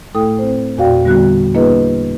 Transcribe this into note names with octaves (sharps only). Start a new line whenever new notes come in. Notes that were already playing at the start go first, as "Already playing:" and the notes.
A2 A3 E4 A4 G5 D#6
C4 C5
E2 A#2 F#4 D5 F5 G5
D3 G3 B3 D4 F#4 F#6
A#3 D4 E4 G#4 B4 D#5